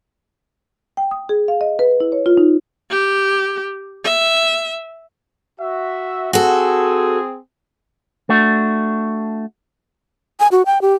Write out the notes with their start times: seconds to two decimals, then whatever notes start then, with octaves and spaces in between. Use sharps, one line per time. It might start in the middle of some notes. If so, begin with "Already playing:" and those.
0.97 G5
1.11 D#6
1.29 G#4
1.48 F5
1.61 D#5
1.79 B4
2.00 E4
2.12 C#5
2.26 F4
2.37 D#4
2.91 G4
4.04 E5
5.60 F#4 E5
6.33 C4 F#4 G#4 A4
8.29 A3 D4 F#4
10.40 G#5
10.52 F#4
10.66 G5
10.82 G4